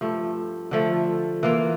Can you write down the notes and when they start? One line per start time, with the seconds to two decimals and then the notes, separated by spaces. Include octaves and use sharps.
0.01 G2 F3 A3
0.71 D3 F3 A3
1.43 E3 A#3 F4